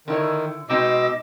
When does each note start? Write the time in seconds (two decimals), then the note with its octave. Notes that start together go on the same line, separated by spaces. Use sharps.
0.08 D3 D#3 E4 C#5
0.70 B2 G#3 C4 D#4 D#5 D6 E6